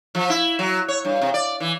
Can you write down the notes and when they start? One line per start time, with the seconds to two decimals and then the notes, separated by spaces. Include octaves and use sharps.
0.15 F3
0.30 E4
0.59 F#3
0.88 C#5
1.05 G2
1.21 C3
1.34 D5
1.60 E3